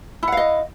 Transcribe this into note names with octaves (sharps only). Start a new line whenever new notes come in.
E4 D#5 F5 F#5